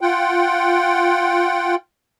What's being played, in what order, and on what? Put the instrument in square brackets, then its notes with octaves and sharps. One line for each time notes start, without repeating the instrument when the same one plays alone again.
[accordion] F4 F#5 G5